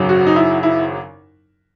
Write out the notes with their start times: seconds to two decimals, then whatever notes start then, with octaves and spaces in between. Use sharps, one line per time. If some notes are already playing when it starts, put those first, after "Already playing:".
Already playing: G#1 F#2 C#3 F#3
0.09 F#4
0.27 D#4
0.36 E4
0.63 E4